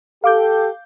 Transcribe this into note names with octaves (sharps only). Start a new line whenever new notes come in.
G4 A4 F5 D6 G6